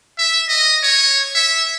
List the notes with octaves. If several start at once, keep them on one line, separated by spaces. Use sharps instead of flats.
E5
D#5
C#5
E5